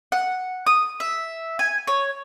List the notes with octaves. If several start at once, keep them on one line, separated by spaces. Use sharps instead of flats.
F#5
D#6
E5
G#5
C#5